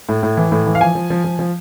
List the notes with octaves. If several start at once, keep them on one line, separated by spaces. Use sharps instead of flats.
A2
A2
E3
A2
E3
F5
F3 G#5
F3
F3
F3
F3